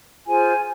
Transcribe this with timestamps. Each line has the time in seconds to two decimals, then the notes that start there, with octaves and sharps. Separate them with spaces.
0.27 F4 G#4 C5 G#5